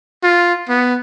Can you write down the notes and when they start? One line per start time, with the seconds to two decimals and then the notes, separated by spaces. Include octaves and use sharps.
0.23 F4
0.68 B3